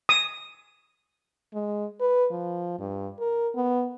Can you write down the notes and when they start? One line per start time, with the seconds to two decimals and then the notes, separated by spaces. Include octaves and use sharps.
0.09 D#6
1.54 G#3
2.00 B4
2.31 F3
2.79 G2
3.19 A#4
3.56 B3